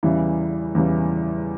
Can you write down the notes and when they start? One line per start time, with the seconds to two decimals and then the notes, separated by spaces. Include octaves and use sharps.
0.03 E2 C#3 E3 G3
0.75 E2 C#3 E3 G3